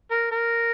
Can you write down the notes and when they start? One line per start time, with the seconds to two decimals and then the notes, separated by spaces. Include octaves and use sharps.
0.11 A#4
0.31 A#4